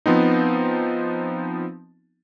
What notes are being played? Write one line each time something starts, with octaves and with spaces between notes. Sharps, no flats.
F3 B3 C4 D#4